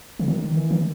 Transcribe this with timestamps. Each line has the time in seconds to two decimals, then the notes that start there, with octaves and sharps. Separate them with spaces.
0.19 D3
0.28 D#3
0.56 E3
0.71 D#3